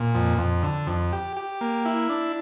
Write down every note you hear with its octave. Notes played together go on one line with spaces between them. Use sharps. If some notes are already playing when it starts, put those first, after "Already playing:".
Already playing: A#2
F2
F2
D3
F2
G4
G4
A#3
E4
D4